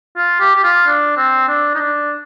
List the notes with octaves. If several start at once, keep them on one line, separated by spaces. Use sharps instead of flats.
F4
G4
G4
F4
D4
C4
D4
D#4
D4